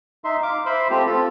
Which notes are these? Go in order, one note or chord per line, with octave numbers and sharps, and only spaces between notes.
D#4 E5 C6
F5 D6
C5 E5 B5 C6
A3 C4 F4 G4
C4 F4 A4